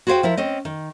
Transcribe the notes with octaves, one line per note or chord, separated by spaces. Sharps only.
F#4 G#4 C5 D5 F5 G5
F3 E4 A#4
C4 C#4 D#5
D#3